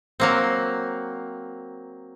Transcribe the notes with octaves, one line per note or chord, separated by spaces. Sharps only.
F#3 A#3 C4